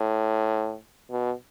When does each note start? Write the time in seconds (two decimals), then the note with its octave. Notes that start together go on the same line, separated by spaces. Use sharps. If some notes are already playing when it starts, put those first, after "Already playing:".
Already playing: A2
1.11 B2